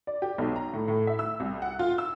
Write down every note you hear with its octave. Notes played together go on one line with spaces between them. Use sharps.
D5
G4
B1
A#5
A2
A2
E5
E6
C2
F#5
F4
E6